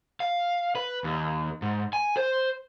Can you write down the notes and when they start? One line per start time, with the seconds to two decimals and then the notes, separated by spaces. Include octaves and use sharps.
0.20 F5
0.75 B4
1.04 D#2
1.62 G#2
1.93 G#5
2.17 C5